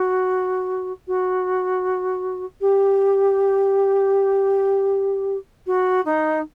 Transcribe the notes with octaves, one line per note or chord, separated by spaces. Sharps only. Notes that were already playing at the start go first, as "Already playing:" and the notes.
Already playing: F#4
F#4
G4
F#4
D#4